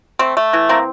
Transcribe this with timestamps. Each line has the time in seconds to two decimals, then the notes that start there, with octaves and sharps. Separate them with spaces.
0.19 A3 C4
0.37 A3
0.53 E3
0.69 A#3 C4